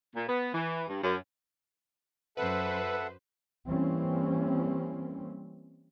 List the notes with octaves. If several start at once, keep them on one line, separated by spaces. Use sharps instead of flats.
A#2
B3
E3
G2
F#2
F#2 A4 B4 C5 E5 F#5
E3 G3 A#3 C4 C#4